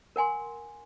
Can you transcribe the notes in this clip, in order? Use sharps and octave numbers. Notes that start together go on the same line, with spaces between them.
A#4 F#5 G#5 C6